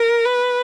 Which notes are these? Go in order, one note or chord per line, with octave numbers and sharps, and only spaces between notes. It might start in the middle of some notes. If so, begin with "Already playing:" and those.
Already playing: A#4
B4